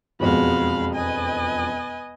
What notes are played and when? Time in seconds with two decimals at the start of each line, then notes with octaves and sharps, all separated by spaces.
0.20 E1 F2 G#3 F#4 F5 B5
0.95 B4 D#5 G#5